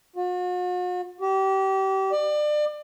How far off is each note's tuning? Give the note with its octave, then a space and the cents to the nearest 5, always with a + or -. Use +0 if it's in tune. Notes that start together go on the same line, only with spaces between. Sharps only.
F#4 -45
G4 -30
D5 +30